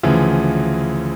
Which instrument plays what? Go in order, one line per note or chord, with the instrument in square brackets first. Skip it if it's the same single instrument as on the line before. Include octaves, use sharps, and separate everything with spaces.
[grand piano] D2 C#3 E3 F3